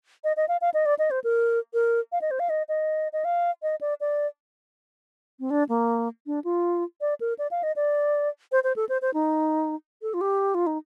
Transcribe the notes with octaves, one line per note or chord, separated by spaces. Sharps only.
D#5
D#5
F5
F5
D#5
D5
D#5
C5
A#4
A#4
F5
D#5
C5
F5
D#5
D#5
D#5
F5
D#5
D5
D5
C4
D4
A#3
D4
F4
D5
A#4
D5
F5
D#5
D5
C5
C5
A4
C5
C5
D#4
A4
F4
G4
F4
D#4